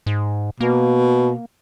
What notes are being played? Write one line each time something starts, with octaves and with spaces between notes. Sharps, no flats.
G#2
B2 A#3